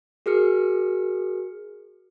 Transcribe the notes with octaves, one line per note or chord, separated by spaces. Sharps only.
F#4 G#4 A#4 F6 C#7